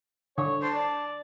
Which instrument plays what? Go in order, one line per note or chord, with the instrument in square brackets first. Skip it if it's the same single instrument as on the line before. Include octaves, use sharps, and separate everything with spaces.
[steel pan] D3 [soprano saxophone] C#5
[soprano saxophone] C5 [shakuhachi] A5
[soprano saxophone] D5